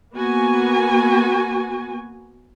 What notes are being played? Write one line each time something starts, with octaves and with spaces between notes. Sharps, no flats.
A#3 B3 F#4 G#5